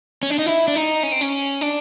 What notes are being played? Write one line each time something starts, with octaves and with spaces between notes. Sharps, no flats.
C#4
D4
D#4
E4
D4
D#4
C#4
C4
C#4
D4